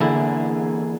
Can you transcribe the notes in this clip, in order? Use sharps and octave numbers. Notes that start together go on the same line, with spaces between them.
D3 E3 A#3 E4 G#4